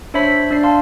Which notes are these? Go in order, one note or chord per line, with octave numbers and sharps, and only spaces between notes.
D4 C5 C#5 E5 B5 B6
D4 D5 C7
F5 A5 C6